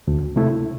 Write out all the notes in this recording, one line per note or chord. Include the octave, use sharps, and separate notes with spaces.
D2
C3 A3 E4